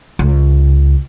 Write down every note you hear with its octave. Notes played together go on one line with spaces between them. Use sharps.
C#2